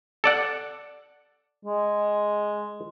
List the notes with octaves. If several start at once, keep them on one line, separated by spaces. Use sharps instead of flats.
A4 D5 F#5
G#3